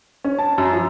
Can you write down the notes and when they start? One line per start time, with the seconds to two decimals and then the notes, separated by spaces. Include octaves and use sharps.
0.24 C#4
0.38 A5
0.58 F#2
0.73 F3